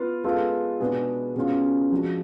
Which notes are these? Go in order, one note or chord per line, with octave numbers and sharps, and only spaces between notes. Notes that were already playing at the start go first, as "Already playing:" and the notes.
Already playing: B3 F4 B4 F5
G#3 B3 F4 A4
B2 G#3 D4 G#4 B4
B2 G#3 C#4 F4
F3 G#3 D4 F#4